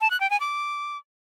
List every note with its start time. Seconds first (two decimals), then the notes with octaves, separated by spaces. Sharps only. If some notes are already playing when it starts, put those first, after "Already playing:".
0.01 A5
0.11 F#6
0.20 G5
0.30 G#5
0.40 D6